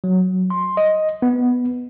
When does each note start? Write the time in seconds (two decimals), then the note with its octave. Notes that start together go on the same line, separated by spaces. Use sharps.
0.04 F#3
0.50 C6
0.77 D#5
1.22 B3